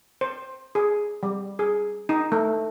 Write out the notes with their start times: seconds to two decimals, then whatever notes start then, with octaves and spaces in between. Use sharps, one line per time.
0.21 C5
0.75 G#4
1.23 G3
1.59 G#4
2.09 D#4
2.32 A3